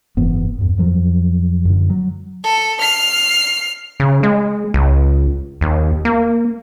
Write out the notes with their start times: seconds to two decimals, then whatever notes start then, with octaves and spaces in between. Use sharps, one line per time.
0.17 F#1 G#2 E3 B3
0.58 E2 G2
0.78 F2 F3 F#3
1.65 F#2 D3
1.90 F#3
2.44 A4
2.81 F6 C7
4.00 C#3
4.23 G#3
4.74 C#2
5.61 D#2
6.05 A#3